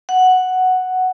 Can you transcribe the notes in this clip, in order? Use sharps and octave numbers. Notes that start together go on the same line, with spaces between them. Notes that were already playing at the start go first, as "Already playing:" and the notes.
F#5